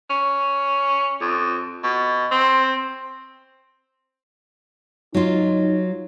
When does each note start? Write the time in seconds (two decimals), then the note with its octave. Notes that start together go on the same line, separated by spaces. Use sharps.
0.10 C#4
1.21 F2
1.84 B2
2.31 C4
5.14 F#3 D#4 F4